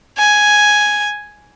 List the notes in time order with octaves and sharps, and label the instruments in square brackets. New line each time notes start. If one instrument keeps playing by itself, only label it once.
[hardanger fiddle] G#5